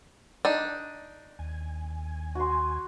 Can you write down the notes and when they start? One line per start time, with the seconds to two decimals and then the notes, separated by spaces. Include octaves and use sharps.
0.45 D4 D#4
1.39 D#2 G#5
2.35 F#4 C6